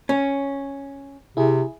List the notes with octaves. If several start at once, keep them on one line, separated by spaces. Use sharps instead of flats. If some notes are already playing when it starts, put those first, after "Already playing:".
C#4
C3 E4 G#4